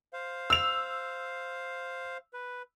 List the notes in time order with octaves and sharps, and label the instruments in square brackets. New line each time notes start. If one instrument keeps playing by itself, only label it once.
[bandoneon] C5 F5
[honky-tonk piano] E6 F7
[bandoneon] B4